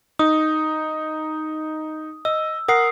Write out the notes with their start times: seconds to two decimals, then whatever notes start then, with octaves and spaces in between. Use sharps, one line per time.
0.19 D#4 D#6
2.25 D#5 E6
2.68 A#4 F#5 D#6 C7